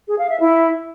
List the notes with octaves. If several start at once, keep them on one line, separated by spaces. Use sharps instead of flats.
G#4
F5
E5
E4